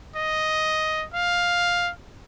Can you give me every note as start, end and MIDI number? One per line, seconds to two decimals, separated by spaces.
0.16 1.06 75
1.14 1.91 77